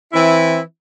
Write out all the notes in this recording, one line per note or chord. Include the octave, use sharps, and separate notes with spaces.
E3 C4 E4